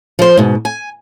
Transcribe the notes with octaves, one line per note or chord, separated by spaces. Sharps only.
F3 C5
G#2 B2
G#5